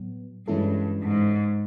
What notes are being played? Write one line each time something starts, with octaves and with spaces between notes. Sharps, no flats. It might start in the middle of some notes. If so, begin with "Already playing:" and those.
Already playing: A2 F#3 B3
G2 E3 G#3 C#4 E4 A4
G#2